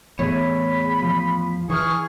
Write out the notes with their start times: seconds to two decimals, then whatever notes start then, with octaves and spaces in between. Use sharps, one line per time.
0.19 E2 A2 G#4 C#5 B5
1.02 F3
1.70 E3 G#4 C#6 F6